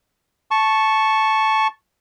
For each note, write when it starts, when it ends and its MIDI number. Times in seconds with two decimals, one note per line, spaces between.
0.51 1.67 81
0.51 1.67 85